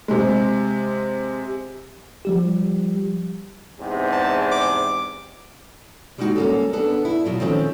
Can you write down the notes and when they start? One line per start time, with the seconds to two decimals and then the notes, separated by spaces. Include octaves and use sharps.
0.08 C3 G#3
2.25 F3 G3 G4
3.79 E2 G#2 C3
4.12 A5
4.52 D6
6.18 G3 G#3 A#3 D#4 F#4
6.36 A#3 C#4 A4
6.73 B3 D4 A4
7.05 E4
7.26 B2 F#3 F4
7.40 D#3 F3 A3 C4 C#4